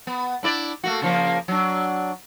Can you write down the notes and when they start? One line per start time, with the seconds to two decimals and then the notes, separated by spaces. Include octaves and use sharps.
0.07 B3
0.43 D4 E4 D5
0.84 A3 A#3 F#4
1.02 C#3 F3 A#3
1.48 F#3 D4